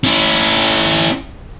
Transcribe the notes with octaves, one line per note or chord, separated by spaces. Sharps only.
C#4 E4